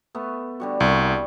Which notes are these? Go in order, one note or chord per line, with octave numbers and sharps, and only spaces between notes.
A3 B3
D3 G3 F#4
C2 C#6